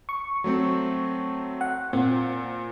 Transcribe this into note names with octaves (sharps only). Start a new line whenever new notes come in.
C#6
F#3 A3 C4
F#5
A#2 C4